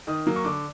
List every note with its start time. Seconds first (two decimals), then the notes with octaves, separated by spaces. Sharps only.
0.07 D#3 D#6
0.27 F#3 A#3
0.36 C#6
0.45 D3 D6